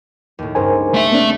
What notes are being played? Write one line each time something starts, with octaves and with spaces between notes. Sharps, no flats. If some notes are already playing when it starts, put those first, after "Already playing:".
D#2 A2
C#2 G2 C#4 A#4 C5 G#5
A3 E5
A#3 C4 D4